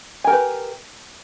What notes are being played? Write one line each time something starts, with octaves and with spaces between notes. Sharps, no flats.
G4 A#4 B4 G#5